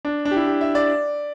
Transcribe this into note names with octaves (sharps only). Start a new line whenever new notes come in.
D4
D4
G4
E4
G4
E5
D5